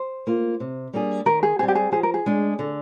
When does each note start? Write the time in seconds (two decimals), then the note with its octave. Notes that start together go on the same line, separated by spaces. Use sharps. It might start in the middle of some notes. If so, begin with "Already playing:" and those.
Already playing: C5
0.27 A#3 F4
0.60 C3
0.93 G3 A#3 D4 G#4
1.26 D#3 A#4
1.43 G#4
1.59 G3 C4 G#4
1.68 G4
1.75 G#4
1.92 F3 G#4
2.03 A#4
2.14 G#4
2.26 G#3 D4
2.59 D3